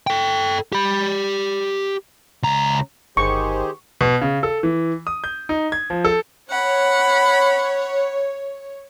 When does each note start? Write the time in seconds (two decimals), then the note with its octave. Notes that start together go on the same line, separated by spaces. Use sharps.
0.07 A4 G5
0.72 G4 B5
2.43 C#2 A#5
3.17 G1 D#3 G4 G#4 C5 C#6
4.01 B2
4.21 C#3
4.43 A4
4.63 E3
5.07 D#6
5.24 G6
5.49 D#4
5.72 G#6
5.90 F3
6.05 A4
6.50 C#5 F#5 B5